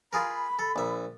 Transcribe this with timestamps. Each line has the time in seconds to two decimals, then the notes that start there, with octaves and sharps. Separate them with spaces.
0.13 F4 G#4 A#4 B5
0.59 A4
0.76 A#1 E5